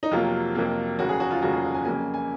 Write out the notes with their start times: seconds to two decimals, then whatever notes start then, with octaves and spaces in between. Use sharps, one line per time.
0.03 D#4
0.11 F2 C3 F#3 A#3 F4
0.55 F2 C3 F#3 A#3
0.99 F1 D#2 C#3 F#3 F#4
1.09 G#4
1.20 F#4
1.31 F4
1.42 F1 D#2 C#3 F#3 F#4
1.53 G#4
1.74 G#5
1.85 F2 C#3 F#3 A#3 G#5
2.14 G#5